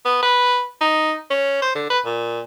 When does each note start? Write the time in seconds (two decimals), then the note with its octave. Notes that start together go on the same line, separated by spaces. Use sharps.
0.05 B3
0.22 B4
0.81 D#4
1.31 C#4
1.62 C5
1.75 D3
1.90 B4
2.05 A#2